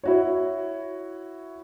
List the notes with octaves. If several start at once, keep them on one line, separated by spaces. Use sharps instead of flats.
E4 F#4 C#5